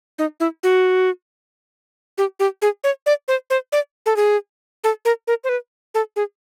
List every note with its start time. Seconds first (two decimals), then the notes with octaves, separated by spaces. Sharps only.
0.18 D#4
0.40 E4
0.63 F#4
2.18 G4
2.40 G4
2.62 G#4
2.84 C#5
3.06 D5
3.28 C5
3.50 C5
3.72 D5
4.06 A4
4.16 G#4
4.84 A4
5.05 A#4
5.27 A#4
5.44 C5
5.49 B4
5.94 A4
6.16 G#4